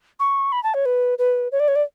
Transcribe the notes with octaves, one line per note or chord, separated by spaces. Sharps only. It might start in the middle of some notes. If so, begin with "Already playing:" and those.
C#6
B5
A5
C#5
B4
B4
C#5
D5
C#5
D5